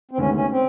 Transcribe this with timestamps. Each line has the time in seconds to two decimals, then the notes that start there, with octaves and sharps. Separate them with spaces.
0.11 C4
0.18 D2 C3 D#3 G#3 B3 C#4
0.35 C#4
0.50 C4